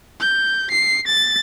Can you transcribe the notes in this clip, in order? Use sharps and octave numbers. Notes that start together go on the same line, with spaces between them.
G6
C7
A6